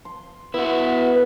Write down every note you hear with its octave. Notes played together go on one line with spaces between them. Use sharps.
C6
B3 E4 F#4 B4 F#5